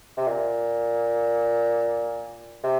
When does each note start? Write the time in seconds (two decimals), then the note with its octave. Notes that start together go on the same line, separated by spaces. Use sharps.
0.17 C3
0.27 A#2
2.64 C3